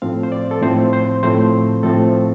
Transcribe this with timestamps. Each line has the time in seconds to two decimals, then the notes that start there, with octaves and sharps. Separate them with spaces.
0.02 A2 F3 A3 C4 F5
0.23 C5
0.32 D5
0.51 A4
0.62 A2 F3 A3 C4 C5
0.93 C5
1.23 A2 F3 A3 C4 C5
1.83 A2 F3 A3 C4 A4